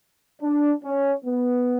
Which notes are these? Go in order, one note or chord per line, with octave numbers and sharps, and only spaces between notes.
D4
C#4
B3